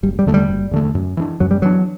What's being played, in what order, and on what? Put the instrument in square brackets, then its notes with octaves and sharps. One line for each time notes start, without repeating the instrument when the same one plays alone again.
[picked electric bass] F#1 [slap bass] G3
[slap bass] G3
[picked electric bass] E2 D3 A3
[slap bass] G3
[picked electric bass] F#1
E2 D3 A3
F#2
E3 B3 D4
[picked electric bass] F#2 [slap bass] F#3
[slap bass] G3
[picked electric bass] E3 B3 D4 [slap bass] F#3